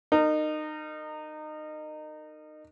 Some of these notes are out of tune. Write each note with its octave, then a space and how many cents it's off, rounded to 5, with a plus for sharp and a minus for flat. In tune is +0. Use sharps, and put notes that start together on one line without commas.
D#4 -25 A#4 -30